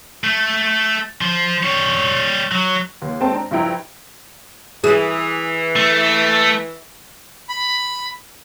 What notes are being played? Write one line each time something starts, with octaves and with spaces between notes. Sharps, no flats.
A3
F3
G3 C#5
F#3
D#2
G#3 C4 A4 G5 A5
D4 A#5
G2 F3 E4 G5 A#5
E3 G#4
A3
B5